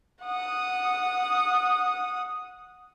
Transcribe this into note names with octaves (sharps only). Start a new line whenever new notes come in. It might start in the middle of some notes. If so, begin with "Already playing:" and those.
F#5 D#6